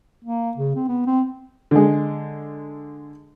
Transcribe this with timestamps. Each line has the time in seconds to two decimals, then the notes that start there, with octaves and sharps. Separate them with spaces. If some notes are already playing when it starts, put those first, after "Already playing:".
0.25 A#3
0.57 C#3
0.76 C4
0.88 B3
1.06 C4
1.71 D3 G#3